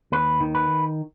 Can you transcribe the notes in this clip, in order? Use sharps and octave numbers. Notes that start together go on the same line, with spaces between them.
D#2 B4
D#3
B4